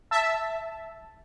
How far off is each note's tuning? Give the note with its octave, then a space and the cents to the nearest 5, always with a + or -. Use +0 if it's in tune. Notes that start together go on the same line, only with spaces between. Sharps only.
E5 +0 A5 +0